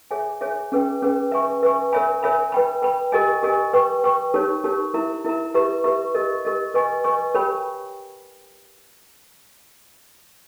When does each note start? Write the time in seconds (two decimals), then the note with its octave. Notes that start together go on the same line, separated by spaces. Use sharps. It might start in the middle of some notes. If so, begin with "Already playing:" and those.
0.11 G#4 C#5 E5 G#5
0.41 G#4 C#5 E5 G#5
0.72 C#4 G#4 B4 G5
1.02 C#4 G#4 B4 G5
1.31 B4 E5 G#5 C#6
1.63 B4 E5 G#5 C#6
1.93 A#4 C#5 E5 G#5 B5
2.23 A#4 C#5 E5 G#5 B5
2.52 B4 G5 B5
2.82 B4 G5 B5
3.12 G4 A#4 D#5 G#5
3.43 G4 A#4 D#5 G#5
3.73 B4 G5 C#6
4.04 B4 G5 C#6
4.34 D#4 G4 A#4 C#5
4.64 D#4 G4 A#4 C#5
4.94 E4 A#4 E5 A#5
5.24 E4 A#4 E5 A#5
5.54 G4 B4 E5 A#5 C#6
5.84 G4 B4 E5 A#5 C#6
6.14 G4 A#4 D#5
6.45 G4 A#4 D#5
6.74 B4 D#5 G#5 C#6
7.04 B4 D#5 G#5 C#6
7.35 G4 A#4 C#5 G5 B5